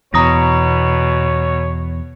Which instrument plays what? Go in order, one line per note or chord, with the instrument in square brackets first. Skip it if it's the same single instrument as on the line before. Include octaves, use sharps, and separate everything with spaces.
[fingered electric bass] E2 [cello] B2 [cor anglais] C#5 [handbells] A#5 D#6 A#6